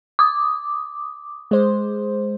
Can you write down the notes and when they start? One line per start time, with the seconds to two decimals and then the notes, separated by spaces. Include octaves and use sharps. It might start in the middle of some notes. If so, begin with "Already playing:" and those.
0.19 D6 D#6
1.51 G#3 C5